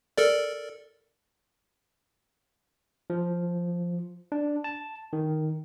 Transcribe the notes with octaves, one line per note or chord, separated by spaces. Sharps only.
A4 A#4 D5
F3
D4
A5
D#3